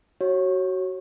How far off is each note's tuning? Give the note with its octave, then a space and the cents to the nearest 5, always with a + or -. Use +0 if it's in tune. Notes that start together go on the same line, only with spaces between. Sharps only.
F#4 +20 C#5 -15